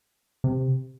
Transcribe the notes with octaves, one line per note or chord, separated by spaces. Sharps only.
C3